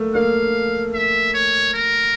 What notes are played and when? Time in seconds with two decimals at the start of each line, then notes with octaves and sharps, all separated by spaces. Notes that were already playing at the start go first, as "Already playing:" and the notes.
Already playing: A3 A#3
0.14 A#3 F5
0.94 E5
1.34 C#5
1.74 A#4